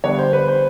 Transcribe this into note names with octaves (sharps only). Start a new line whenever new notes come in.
D3 G3 B3 D4 C#5
C5
B4
C5